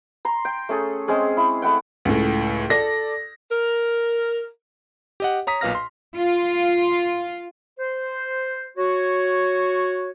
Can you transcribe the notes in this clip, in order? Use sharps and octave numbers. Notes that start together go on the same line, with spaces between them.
A#5 C6
G5
A3 C#4 G#4 A4
G#3 C4 C#4 G#4
E4
A3 E4 F#5 G5
C#2 A2
A4 D5 A#6
A#4
G4 D#5 F#5
C#5 A#5 D#6 B6
B1 A#2 B4 F5 F6 A#6
C6
F4
C5
F#4 C#5